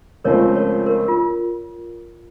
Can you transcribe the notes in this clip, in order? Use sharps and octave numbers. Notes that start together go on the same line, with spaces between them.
C#2 C#3 F3 A3 C4 A#4 C#5
A#4 C#5
A#4
F4